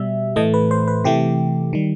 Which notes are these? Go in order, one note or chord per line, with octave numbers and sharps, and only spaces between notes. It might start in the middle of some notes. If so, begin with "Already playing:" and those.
Already playing: B2 G3 E5
A2 E3 A3 D#5
B4
C5
B4
C3 E3 A3 G4
D#3 G3